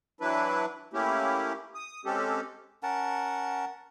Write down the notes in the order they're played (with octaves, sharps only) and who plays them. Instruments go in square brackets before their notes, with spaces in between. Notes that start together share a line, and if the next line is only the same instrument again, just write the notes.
[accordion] E3 F#3 D4 E4 B4
A3 A#3 C#4 E4 G4
D#6
G#3 C4 C#4 G4 A4
[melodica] C#4 A#4 F#5 A5